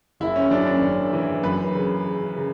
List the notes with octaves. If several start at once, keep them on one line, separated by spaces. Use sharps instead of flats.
F#1 E4
C#4
F#2 D4
C#4
F#1
E3
F#2 B4
C#3
C#3
C#3